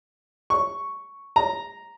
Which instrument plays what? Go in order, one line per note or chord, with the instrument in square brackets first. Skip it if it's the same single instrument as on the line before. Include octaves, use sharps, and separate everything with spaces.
[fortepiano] C#6
A#5